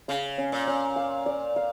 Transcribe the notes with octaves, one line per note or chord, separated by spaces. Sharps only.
C#3 F5
C#4
A#2
C#4
F5
D5
F5